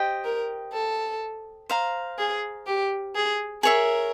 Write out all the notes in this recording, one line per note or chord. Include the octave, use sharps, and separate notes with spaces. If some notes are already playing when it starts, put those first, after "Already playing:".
Already playing: G4 C5 D#5 G5
A#4
A4
C5 F5 A#5
G#4
G4
G#4
G#4 A#4 C#5 E5